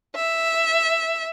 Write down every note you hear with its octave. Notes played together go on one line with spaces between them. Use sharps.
E5